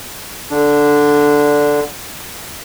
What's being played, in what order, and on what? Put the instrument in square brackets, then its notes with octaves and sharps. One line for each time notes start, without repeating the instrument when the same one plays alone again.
[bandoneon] D3 D4